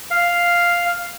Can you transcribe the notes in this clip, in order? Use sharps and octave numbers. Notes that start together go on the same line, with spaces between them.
F5